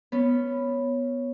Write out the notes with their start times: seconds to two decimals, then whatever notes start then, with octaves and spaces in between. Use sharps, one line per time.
0.12 B3 C#4